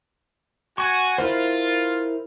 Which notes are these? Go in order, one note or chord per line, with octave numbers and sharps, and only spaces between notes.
F#4 G#5 C#6
E4 F4 A#4 C5